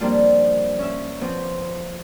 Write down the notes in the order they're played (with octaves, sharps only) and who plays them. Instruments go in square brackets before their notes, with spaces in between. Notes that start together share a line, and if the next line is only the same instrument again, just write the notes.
[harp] F3 G3 A#3 C4 D4 F4
C#4 E5
F3 B3 C4